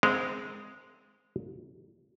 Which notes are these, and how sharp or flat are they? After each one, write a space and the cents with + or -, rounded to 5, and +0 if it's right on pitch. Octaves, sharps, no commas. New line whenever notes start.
G#3 +0 C4 -20 A#4 -30